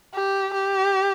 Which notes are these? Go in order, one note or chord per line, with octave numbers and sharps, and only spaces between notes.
G4
G4